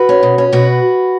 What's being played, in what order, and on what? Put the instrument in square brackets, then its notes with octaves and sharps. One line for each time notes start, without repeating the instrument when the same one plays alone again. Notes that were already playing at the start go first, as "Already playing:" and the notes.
Already playing: [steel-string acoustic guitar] F#4 B4
C#4
B2
C#4
B2 F#4 B4